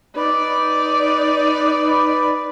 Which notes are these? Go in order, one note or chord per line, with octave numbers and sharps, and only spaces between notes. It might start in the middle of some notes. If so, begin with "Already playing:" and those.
D#4 B4 D5